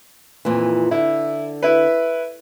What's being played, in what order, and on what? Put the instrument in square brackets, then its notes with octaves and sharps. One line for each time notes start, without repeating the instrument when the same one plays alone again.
[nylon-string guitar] F2 A#2 E3
[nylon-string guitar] D3 [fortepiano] E4
[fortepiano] E4 B4